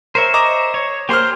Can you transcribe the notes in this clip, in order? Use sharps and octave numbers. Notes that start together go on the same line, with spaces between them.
A#4 C5 C#5 E5
D#5 A#5 D6
C#5
A#3 G4 G#4 C5 C6 F6